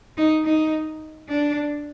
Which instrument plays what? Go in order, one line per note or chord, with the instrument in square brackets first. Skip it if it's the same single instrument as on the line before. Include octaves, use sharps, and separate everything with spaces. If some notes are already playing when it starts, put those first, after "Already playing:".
[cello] D#4
D#4
D4